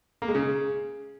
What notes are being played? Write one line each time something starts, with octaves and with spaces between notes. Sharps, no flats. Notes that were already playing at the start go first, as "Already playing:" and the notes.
A#3
G#3
C#3